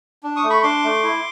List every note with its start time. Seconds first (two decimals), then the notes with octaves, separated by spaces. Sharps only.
0.23 D4
0.36 C#6 D#6
0.43 A3
0.50 B5 C#6
0.63 D4 C6 D6
0.84 A3
1.03 E4